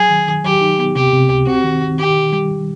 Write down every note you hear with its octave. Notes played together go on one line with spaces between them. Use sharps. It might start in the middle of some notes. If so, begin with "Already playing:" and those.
Already playing: F#3 G#4
D#3
D#3
F#3 G4
D#4
B3
C3 G4
C3
C#2
C4 F#4
D#3
D#3
D#3 G4
D#3
G3